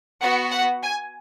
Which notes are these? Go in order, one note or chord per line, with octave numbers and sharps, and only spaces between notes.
B3 F#4 F#5
F#5
G#5